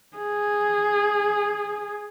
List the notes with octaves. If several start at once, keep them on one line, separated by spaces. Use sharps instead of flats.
G#4